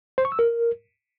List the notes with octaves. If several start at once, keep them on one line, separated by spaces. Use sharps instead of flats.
C5
C#6
E6
A#4